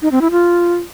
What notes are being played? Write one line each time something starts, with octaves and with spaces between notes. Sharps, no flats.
D#4
C4
E4
F4